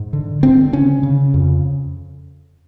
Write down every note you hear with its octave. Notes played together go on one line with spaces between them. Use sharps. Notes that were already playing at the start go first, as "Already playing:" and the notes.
Already playing: G#2
D3
D3 C4
C#3 C#4
C#3
F2